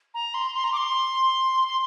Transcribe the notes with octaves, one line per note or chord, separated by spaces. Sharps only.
A#5
C6
C6
A#5
D6
C6
C6